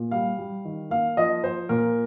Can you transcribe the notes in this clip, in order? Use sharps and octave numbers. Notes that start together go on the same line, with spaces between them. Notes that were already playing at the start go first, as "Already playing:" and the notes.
Already playing: A#2
G3 F5
G3
D#3
A#3 F5
F3 D#5
F3 C5
A#2 A#4